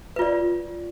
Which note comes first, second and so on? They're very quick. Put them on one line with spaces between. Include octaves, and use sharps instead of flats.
B4 F4 D5